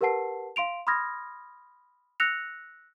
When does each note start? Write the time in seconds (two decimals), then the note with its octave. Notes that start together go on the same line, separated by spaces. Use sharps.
0.01 G4 A#4 B4 F#5 A5 C7
0.56 F5 C6 D7 F7
0.87 B5 C6 D#6 F6 G#6 A#6
2.20 E6 F#6 A#6 C#7 F7